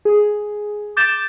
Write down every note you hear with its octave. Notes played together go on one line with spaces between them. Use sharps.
G#4
D6 G6 A6 E7